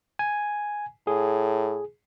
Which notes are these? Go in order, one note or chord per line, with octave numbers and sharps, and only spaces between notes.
G#5
A2 G#4